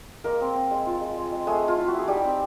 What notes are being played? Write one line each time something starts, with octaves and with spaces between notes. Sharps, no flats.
G#3 A#3 A#4
C4
C4
G#3
F4
G#3
G#3
G#3
G#3 A3 G#4
A3
F4
E4
F#4
E4
G#4
G3 D#4 G4
C4